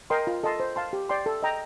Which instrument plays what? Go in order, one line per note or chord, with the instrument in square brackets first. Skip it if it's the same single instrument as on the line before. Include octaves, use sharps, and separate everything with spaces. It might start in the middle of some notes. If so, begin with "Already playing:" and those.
[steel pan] A#4 D#5 G5 C6
F4
A4 D#5 A5 C6
C5
F5 A5 C6
G4
D5 G5 C6
A4
D#5 G5 A#5